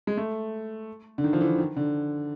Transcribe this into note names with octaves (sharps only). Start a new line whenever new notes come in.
G#3
A3
D3
D#3
F3
E3
D#3
D3